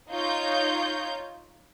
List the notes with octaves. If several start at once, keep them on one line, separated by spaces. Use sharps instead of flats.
D#4 F4 C#5 G6